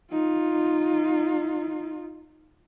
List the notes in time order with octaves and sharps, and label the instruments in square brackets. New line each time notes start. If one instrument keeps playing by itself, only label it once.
[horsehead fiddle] D#4 F4